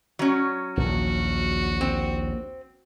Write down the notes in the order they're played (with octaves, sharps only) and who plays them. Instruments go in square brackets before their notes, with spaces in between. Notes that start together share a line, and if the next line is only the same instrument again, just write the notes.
[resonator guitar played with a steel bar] F#3 C#4
[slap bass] A#1 D#2 [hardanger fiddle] F#4
[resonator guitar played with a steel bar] C4